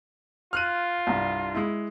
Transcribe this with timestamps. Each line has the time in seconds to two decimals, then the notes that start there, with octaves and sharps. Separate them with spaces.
0.53 F4 F6 F#6 D#7
1.07 C2 G2
1.55 G#3 E4